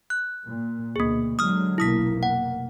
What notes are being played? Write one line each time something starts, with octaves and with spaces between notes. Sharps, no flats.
F#6
A#2
D2 B2 A#3 G#4
D3 F#3 G#3 D#6 F6
F1 B1 A#3 E4 D#6 B6
F#5